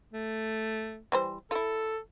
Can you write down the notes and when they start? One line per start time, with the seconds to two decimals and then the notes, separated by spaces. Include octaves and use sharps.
0.13 A3
1.12 E3 G3 C5
1.51 E4 F4 A4